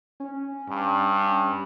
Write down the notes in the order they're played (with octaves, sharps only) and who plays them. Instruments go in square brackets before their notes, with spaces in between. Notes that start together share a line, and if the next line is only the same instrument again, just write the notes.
[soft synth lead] C#4
[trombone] G2